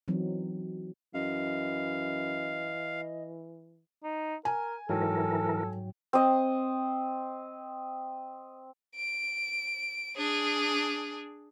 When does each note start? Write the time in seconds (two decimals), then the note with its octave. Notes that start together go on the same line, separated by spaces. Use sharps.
0.08 E3 F#3 C4 D#4
1.14 F#2 E3 D#5 F5
4.03 D#4
4.45 A#4 G#5
4.89 G#2 E3 F#3 A4 A#4 G5
6.13 C4 D#5
8.96 D7
10.17 D4 G#4